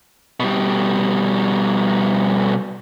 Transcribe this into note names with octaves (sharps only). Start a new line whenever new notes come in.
B2 G3